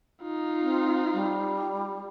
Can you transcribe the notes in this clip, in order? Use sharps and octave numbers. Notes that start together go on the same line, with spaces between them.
D#4 F4
C4
G3